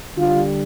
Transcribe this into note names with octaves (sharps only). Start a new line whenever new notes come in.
D3 G3 F4